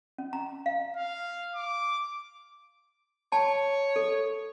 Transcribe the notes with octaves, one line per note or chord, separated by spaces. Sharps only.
C#4
A#5
F5
F5
D6
C#5 A5
A4